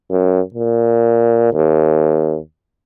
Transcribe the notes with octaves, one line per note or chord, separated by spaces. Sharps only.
F#2
A#2
D#2